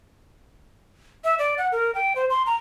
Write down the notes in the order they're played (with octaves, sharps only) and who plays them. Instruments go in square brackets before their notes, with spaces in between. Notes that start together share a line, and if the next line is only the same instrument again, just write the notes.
[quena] E5
D5
F#5
A#4
G5
C5
C6
A#5